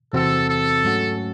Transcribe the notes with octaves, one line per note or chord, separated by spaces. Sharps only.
E2 C3 E3 C4 F#4 A4
A4
G#2 F#3 A3 C#4 F#4